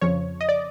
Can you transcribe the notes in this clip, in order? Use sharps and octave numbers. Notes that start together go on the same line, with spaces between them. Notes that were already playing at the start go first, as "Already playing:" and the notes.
F2 C#3 F3 C#5
D#5
D5